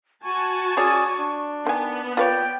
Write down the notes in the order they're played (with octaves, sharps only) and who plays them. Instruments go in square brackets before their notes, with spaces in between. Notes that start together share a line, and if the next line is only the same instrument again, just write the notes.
[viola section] F#4 G#5 A5 [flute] C#6
[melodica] C#4 D5 D#6 [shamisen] G#4 C#5
[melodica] D4
[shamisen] D#3 G#5 [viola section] B3
[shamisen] F4 B4 C#5 [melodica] D5 [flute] G5